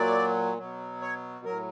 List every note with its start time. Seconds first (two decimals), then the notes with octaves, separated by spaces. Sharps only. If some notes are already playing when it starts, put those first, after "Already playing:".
Already playing: A#2 F#3 D5
0.58 B2 F#3
1.01 C#5
1.45 A2 F#3 A#4